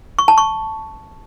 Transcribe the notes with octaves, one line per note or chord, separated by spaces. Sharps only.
C#6
A5
C#6